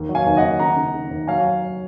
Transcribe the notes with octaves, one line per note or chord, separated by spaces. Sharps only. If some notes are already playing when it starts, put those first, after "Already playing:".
Already playing: D#2
F#3
F5 G#5
D#2
D#5 F#5
D#2
C#3 F#5 A#5
C#3
C#3
D#2
F#3 F5 G#5
F#3
F#3